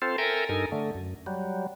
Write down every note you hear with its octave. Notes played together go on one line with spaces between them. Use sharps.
C4 F4 A4 C5
A4 A#4 E5 G5 G#5 A#5
G2 D#4 A4 A#4 G#5
D3 A3
F#2
F#3 G3